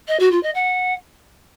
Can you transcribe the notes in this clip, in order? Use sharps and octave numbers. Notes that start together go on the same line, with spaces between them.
D#5
F#4
F4
D#5
F#5